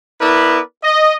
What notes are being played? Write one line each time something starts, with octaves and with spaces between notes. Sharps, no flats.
B3 E4 A#4 B4 D5
D#5